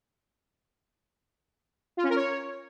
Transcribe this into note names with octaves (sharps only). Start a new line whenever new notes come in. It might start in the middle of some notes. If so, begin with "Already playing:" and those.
F4
C#4
A#4
C#5